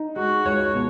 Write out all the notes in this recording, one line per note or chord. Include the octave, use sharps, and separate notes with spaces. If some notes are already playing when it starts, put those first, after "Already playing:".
Already playing: D#4
G#3 F#4
C#2 C#5
B2